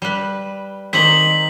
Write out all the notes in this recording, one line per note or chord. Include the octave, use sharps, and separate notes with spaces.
G3 B4
D#3 C4 G4 B6 F#7